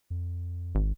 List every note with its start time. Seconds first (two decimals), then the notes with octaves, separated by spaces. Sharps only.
0.10 F2
0.75 G#1